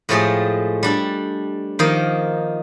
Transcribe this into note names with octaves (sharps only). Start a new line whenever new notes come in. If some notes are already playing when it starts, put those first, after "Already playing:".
A2 F3 G#3 A3 G4 G#4
G3 D4 A4
D#3 F3 A#3 D#4 C5